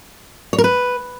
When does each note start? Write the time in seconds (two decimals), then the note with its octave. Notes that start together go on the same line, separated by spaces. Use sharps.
0.53 C#5
0.58 A#4
0.64 B4